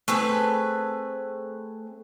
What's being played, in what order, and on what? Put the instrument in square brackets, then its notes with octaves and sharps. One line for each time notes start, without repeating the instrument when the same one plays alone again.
[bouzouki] A3 C4 G#4 B4